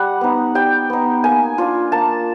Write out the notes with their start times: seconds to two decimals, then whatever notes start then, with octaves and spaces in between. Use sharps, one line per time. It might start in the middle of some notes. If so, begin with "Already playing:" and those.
Already playing: G3 F#5
0.21 B3 D#4
0.55 G3 G5
0.90 B3 D#4
1.24 A#3 G#5
1.58 D4 F4
1.92 A#3 A5